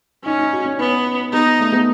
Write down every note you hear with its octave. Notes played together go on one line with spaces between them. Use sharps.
C#4 D#4
D#4
F#4
C#4
B3 C#4
B3 D#4
A3
B3